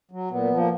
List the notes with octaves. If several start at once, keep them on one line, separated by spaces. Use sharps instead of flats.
F#3
A#2 B3
F3
A#3